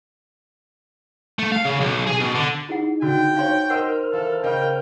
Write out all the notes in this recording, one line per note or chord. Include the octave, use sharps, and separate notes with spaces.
A3
F5
C#3
B1
G#4
B2
D3
D#4 E4 G#4 F#5
D3 F#4 G5
D#4 F#4 C5 C#5 F5 F#5 C6
A#4 C5 D#5 F#5 C6 E6 F6
E3 A4 F5
C#3 D#5 F5 G5